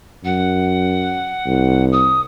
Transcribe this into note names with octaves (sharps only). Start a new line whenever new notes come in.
F#2 F#5
C2
D#6